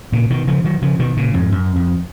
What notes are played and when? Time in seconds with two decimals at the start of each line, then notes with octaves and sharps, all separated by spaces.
0.12 A#2 C#3
0.30 B2 D#3
0.47 C#3 F3
0.65 D#3 F#3
0.82 C#3 F3
0.99 B2 D#3
1.17 A#2 C#3
1.34 F2 G#2
1.52 F#2
1.76 F2